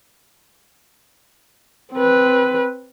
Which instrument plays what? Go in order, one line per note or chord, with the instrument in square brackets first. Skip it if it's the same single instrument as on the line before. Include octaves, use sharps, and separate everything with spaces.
[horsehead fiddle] C4 B4